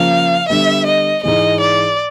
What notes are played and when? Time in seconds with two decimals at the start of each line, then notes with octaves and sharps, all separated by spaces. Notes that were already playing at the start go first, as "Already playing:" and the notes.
Already playing: C#3 F3 A#3 F5
0.49 D3 G3 B3 E5
0.86 D#5
1.23 G#2 E3 G#3 D#5
1.60 D5